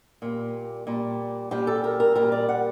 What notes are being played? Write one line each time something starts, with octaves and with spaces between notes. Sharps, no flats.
A#2 G3
A#2 G3
A#2 G3 G4
A4
A#4
A#4
A#2 G3 A#4
D5
F#5